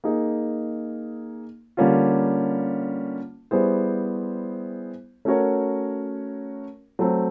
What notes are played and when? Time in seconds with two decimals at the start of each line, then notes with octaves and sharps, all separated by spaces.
0.04 A#3 D#4 G#4
1.77 D3 G3 A#3 C#4 F4
3.51 G3 B3 E4 G#4 C5
5.25 A3 C#4 F#4 A#4 C#5
6.99 F#3 A3 C4